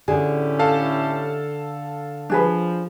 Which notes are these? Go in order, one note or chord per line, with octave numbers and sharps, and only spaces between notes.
A2 D3 C#4 G4 G#4
A4 F5 A5
F3 D4 G#4 B4